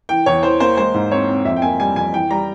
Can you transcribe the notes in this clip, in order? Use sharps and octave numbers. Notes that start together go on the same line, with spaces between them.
E3 G5
E2 C#5
E3 C5
A#3 C5
G#3 C5
G#2
C4 C#5
C4
F2 E5
G5
A#3 G#5
G3 G#5
F2 G#5
E3 G5
G3 A#5